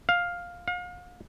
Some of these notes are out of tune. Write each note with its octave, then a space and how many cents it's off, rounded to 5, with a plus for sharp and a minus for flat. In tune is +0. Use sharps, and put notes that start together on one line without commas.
F5 +10
F5 +40